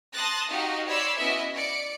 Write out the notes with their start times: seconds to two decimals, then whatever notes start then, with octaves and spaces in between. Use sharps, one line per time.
0.14 A5 C6 D#6 F#6 A6 A#6
0.50 D#4 F#4 G4 D#5 F5
0.86 C#5 D5 B5 C6 E6
1.18 B3 C#4 E4 F#4 D#5 E5
1.55 D5 C#7 D7